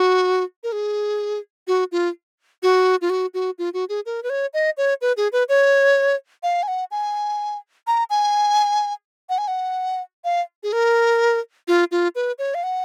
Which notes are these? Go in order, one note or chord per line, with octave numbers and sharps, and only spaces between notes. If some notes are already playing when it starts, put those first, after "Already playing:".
Already playing: F#4
A#4
G#4
F#4
F4
F#4
F4
F#4
F#4
F4
F#4
G#4
A#4
B4
C#5
D#5
C#5
B4
G#4
B4
C#5
F5
G#5
F#5
G#5
A#5
G#5
F#5
G#5
F#5
F5
G#4
A#4
F4
F4
B4
C#5
F5
F#5